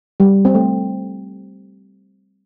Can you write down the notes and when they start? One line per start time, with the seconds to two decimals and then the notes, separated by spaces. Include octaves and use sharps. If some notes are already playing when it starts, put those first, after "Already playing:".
0.20 G3
0.45 C4
0.55 A3